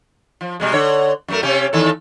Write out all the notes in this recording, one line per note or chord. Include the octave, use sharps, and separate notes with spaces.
F3
B2 G3 G#3
D3 C#5
F#2 A3 A#4
C3 C#4 G4
E2 D#3 A4